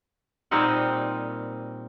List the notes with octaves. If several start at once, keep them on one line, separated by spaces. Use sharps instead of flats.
A#2 G3 A#3 C4 D#4 F#5